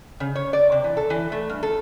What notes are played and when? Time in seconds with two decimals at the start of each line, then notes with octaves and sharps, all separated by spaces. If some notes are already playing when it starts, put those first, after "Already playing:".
0.20 C#3
0.35 C#5
0.53 D5
0.72 C3
0.84 E3
0.97 A4
1.10 E3
1.32 A3
1.50 G2
1.63 A4